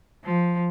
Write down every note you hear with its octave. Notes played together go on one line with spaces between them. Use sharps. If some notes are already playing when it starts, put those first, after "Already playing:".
F3